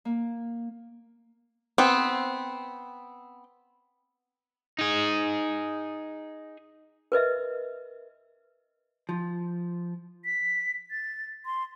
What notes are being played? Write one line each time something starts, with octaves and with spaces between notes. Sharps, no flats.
A#3
B3 C4
D#4 G#4
A#4 B4 D#5 E5
F3
B6
A6
C6